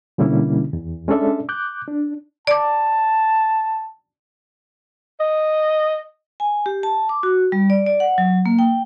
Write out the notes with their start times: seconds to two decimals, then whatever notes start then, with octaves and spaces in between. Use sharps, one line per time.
0.18 B2 D3 G3 A#3 C#4 E4
0.73 E2
1.08 G#3 C#4 D4 A4 D5 E5
1.49 D6 F#6 G6
1.88 D4
2.47 D5 A5 D6
5.20 D#5
6.40 G#5
6.66 G4
6.83 A5
7.09 D6
7.23 F#4
7.52 G3
7.70 D5
7.86 D5
8.00 F#5
8.18 F#3
8.46 A#3
8.59 G5